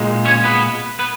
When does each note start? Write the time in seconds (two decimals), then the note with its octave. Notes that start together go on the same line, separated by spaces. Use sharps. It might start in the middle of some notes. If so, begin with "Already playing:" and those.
Already playing: A#2 G#3
0.25 C#4 C#5
0.44 B3 B4
0.99 B3 B4